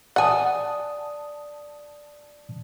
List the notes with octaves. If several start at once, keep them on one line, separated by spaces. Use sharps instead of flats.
D5 F#5 G#5 A5 D#6